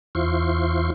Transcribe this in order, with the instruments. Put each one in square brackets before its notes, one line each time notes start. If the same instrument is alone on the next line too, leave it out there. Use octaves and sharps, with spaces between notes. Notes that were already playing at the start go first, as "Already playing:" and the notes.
[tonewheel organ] E2 E4 F4 C5 C6 C#6